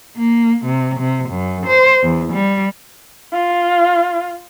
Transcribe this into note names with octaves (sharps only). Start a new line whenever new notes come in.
A#3
C3
C3
F#2
C5
E2
G3
F4